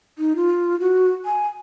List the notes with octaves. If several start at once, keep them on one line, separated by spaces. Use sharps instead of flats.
D#4
F4
F#4
G#5